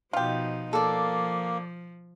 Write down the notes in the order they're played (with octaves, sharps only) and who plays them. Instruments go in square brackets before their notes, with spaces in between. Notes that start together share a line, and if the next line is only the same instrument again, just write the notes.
[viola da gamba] B2 F3 D#4 [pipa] F4 G4
[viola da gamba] F3 [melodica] A#3 [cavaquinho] A4 D5